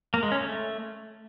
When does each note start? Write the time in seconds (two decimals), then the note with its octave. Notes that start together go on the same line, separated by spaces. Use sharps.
0.14 A#3
0.23 G#3
0.32 C#4
0.41 A3